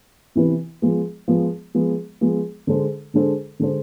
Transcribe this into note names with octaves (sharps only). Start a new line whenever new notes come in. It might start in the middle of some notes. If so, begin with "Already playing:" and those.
C3 E3 B3 E4 B4
F3 G#3 B3
F3 G#3 B3
F3 G#3 B3
F3 G#3 B3
D3 G#3 D4 A4 C5
D3 G#3 D4 A4 C5
D3 G#3 D4 A4 C5